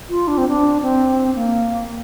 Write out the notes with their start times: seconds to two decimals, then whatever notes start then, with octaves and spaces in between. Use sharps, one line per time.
0.09 F4
0.28 D4
0.38 C4
0.48 D4
0.82 C4
1.35 A#3